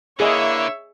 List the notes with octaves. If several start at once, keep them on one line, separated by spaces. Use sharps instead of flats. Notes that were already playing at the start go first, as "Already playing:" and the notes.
D3 A#3 E4 G#4 C#5 D#5 E5